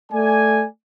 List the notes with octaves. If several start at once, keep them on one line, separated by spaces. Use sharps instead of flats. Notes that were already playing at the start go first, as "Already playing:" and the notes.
A3 D5 G#5